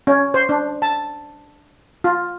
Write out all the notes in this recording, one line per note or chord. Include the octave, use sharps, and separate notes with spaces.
C#4
C5
D4
A5
F4